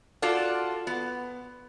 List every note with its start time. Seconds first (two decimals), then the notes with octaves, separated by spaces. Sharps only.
0.22 F4 F#4 A4 D5
0.87 B3